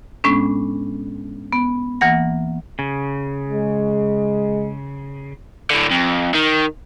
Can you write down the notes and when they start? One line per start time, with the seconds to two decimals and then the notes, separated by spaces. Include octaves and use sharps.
0.24 A2 G#3 B3 C#4 D4
1.53 B3
2.01 D2 E3 A#3 F#5 A#6
2.79 C#3
3.48 G#3
5.70 A2 D3
5.91 F2
6.34 D#3